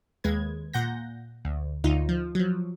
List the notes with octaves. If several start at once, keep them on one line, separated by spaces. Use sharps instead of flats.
D#2 G#3 B4 G#6
A#2 F#5 G6 A#6
D2
D2 D#4 F4
F3
F3 F#3